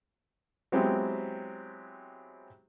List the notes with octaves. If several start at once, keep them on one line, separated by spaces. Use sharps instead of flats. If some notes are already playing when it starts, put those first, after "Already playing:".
F#3 G#3 B3 C4 E4 G4